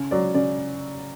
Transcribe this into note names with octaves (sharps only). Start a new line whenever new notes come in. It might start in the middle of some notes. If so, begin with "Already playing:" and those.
Already playing: C#3
F#3 D5
C#3 D5